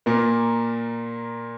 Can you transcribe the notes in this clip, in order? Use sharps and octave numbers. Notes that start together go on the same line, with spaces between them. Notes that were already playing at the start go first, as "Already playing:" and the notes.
A#2 A#3